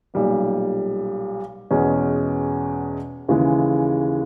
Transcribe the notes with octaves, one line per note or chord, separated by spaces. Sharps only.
B1 A#2 G3 A#3
E2 B2 G#3 C#4
D#2 C#3 E3 G#3